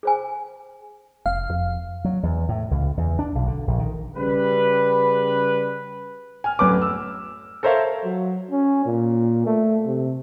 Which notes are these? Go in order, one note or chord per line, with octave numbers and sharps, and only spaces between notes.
G#4 C5 G#5
F1 F5
F2
F#3
E2
A2
C#2
E2
D4
B1
D3
A#1
D#3
C#3 G3 B4
G#5 F6
D1 F#2 B4 D6
E6
A4 A#4 C5 C#5 E5 F5
F#3
C#4
A#2
A3
C3